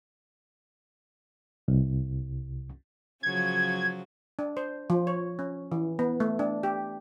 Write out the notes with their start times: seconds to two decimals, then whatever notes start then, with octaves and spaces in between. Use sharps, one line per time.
1.68 C2
3.23 C#3 F3 F#3 G#6
4.39 D4
4.57 C5
4.90 F3
5.07 C#5
5.39 C#4
5.72 E3
5.99 B3
6.20 A3
6.39 D4
6.63 G4